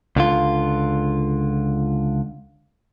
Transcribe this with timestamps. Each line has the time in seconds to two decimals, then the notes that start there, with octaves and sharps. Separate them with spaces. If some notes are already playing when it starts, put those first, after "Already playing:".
0.16 C#2 D3 F4